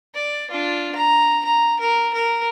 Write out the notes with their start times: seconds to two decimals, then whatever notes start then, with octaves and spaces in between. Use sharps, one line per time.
0.15 D5
0.51 D4 F4
0.95 A#5
1.45 A#5
1.80 A#4
2.14 A#4